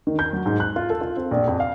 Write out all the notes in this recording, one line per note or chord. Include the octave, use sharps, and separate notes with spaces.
D#3
G6
F#3
G#2
F#6
F4
A4
F4
C4
A#1
F2
F5